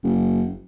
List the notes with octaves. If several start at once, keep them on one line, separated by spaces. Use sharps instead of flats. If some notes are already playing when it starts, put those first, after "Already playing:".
F#1